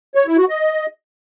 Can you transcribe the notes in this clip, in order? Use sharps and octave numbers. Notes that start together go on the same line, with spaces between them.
C#5
E4
F#4
D#5